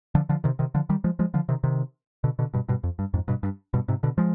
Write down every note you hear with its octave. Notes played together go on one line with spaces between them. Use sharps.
D3 F3
D3 F3
C3 D#3
C3 D#3
D3 F3
D#3 G3
F3 G#3
F3 G#3
D3 F3
C3 D#3
C3 D#3
B2 D3
B2 D3
G2 B2
G2 B2
F2
G2
F2 G#2
G2 B2
G2
G2 B2
G#2 C3
B2 D3
F3 G#3